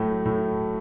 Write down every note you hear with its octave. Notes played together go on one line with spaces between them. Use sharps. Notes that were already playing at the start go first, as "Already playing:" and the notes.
Already playing: A2 F#3 A3
A2